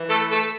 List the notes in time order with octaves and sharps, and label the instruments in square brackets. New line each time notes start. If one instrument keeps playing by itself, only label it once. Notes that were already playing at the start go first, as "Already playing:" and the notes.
Already playing: [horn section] E3
[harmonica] A3 A4
A3 A4